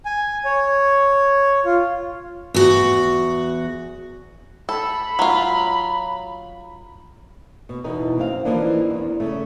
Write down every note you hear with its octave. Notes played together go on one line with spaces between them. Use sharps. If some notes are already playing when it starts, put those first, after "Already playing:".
G#5
C#5
F4
E2 F#4
A4 B5
F#3 F4
B2
E2 B2 E3 D#4
F#2 C4 F5
E3 F3 A#3 D4 D#4
E2 G#2
C#3 A3